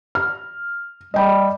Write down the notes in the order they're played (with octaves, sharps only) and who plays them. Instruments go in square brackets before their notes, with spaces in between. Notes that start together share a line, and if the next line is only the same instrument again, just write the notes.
[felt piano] F6
[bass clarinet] G3 [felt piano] D#5 G5 B5